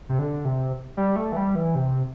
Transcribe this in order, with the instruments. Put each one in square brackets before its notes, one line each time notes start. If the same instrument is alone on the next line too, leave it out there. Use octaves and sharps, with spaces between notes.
[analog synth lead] C3
D3
C3
G3
A3
E3
G3
E3
C3